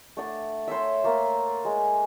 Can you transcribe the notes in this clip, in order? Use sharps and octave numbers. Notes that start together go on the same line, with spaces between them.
A3 D4 F#5
C5 C#5 E5
A3 A#3
G#3